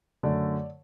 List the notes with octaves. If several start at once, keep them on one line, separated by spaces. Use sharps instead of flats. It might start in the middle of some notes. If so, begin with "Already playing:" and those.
F#2 D3 A3 D5